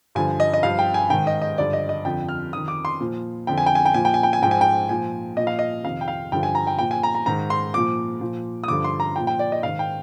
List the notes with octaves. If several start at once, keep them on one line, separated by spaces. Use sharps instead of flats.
G2 D3 F3 G#5
D#5
D#5
G2 F3 F5
G5
G#5
G#2 D#3 G5
D#5
D#5
G2 D3 F3 D5
D#5
D#5
F2 D3 F3 G5
F6
F2 D#3 D#6
D6
C6
A#2 F3
F2 D3 F3 G5
G#5
G5
G#5
G5
A#2 F3 G#5
G5
G#5
G5
G#5
G#2 F3 G5
G#5
G5
A#2 F3 G#5
A#2 F3 D#5
F5
D#5
F2 C3 D#3 F5
G5
F5
G2 D3 F3 G5
G#5
A#5
G5
A#2 F3 G5
G#5
A#5
A#5
G#2 D#3 A#5
C6
A#2 F3 D6
A#2 F3
D#6
G2 D3 F3 D6
C6
A#5
A#2 F3 G5
G5
D5
D#5
G#2 D#3 F5
G5